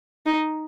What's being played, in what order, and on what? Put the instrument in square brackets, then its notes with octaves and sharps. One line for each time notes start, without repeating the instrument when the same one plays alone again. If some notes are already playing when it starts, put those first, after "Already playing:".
[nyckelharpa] D#4